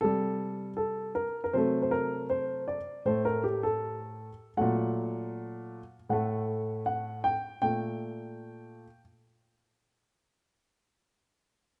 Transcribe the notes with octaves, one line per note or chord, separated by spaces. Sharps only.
C3 G3 A4
A4
A#4
A#4
C3 F#3 A3 C5
C5
A#4
C5
D5
A2 A3 C5
A#4
G4
A4
A#2 F#3 A3 F#5
A2 A3 F#5
F#5
G5
A#2 A3 G5